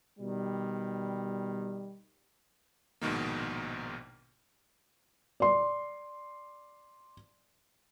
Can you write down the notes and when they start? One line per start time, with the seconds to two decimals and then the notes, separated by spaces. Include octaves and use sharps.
0.19 B2 D#3 G3
3.01 A#1 G#2 B2 D#3 A#3
5.40 D5 C6